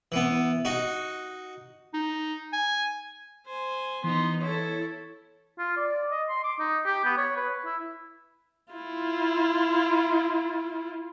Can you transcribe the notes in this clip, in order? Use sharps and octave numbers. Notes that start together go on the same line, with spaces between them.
E3 B3
D#4 F#4
D#4
G#5
C5 G#5
E3 B3 D#4 C6
E4 A4 C#5
F4
D5
D#5
C6
D6
D#4
G4
B3
C#5
B4
E4
E4 F4